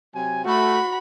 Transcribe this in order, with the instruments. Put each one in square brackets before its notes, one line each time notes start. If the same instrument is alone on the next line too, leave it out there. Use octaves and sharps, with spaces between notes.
[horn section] C3 F#3 G#5
[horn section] A3 [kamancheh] F#4 B5